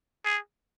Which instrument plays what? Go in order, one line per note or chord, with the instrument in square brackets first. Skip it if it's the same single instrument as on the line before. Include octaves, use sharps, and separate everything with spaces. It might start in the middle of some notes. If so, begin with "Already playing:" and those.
[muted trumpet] G#4